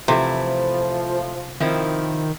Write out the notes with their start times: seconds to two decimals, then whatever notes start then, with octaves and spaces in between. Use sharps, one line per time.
0.08 C3 E3 F3 A3 E4
1.60 D#3 F3 C4 E4